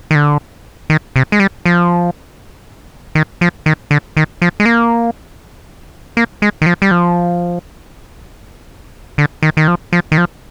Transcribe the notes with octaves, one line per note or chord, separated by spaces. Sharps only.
D#3
D3
D#3
C3
G#3
G3
F3
D#3
F3
D#3
D3
D#3
F3
G#3
A#3
A#3
G#3
D#3
F3
G3
F3
D3
D#3
D#3
F3
F3
D#3
F3